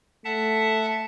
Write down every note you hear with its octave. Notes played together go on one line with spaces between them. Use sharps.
A3 E5 F#5 A5